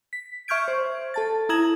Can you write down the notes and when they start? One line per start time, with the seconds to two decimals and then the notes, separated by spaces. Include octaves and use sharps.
0.13 B6
0.48 E5 C#6 F6 G6 G#6 D7
0.68 C5
1.14 A4 A5 A6
1.49 E4 A#5 D#6 G#6 E7 F#7